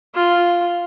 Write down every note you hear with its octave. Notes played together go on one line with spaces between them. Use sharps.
F4